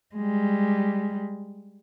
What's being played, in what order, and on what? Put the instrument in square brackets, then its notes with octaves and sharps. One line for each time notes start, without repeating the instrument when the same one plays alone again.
[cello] G3 G#3